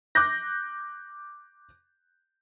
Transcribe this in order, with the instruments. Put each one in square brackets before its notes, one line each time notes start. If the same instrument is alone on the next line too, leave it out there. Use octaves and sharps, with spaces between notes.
[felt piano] D6 F#6 G6 A#6